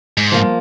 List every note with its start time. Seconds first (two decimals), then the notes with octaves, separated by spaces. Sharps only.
0.18 G#2
0.32 F3 A#3